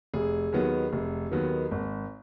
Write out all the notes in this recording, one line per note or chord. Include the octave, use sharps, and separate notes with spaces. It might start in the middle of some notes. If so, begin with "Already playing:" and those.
F1 G#4
D#2 D#3 F#3 B3
F1
D#2 D#3 F#3 B3
G#1